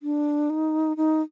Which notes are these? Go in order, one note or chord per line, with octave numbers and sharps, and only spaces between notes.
D4
D#4
D#4